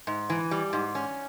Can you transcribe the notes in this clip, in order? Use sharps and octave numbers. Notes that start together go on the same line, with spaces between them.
G#2
E3
G3
G#2
C#4